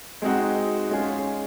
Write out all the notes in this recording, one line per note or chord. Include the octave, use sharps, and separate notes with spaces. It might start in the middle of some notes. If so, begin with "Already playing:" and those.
G#3 C4 D#4 F#4
G#3 C#4 F4 G#4